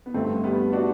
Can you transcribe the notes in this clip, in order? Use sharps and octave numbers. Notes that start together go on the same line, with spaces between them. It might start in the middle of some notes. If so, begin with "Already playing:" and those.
B3
G1 G2 D3 A3 C4
G3 B3
D4 F#4